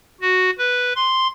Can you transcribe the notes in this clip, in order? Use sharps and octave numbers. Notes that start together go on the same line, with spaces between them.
F#4
B4
C6